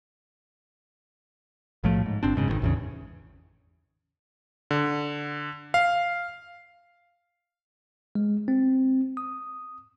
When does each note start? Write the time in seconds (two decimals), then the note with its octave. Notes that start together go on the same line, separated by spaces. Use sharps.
1.84 B1 A2 F3 A3
2.06 G#2
2.23 G1 C4 D4
2.36 F#1 G#2 C#3
2.48 G#1 A#2 D#3
2.62 A1 E2 C#3
4.71 D3
5.74 F5
8.15 G#3
8.48 C4
9.17 D#6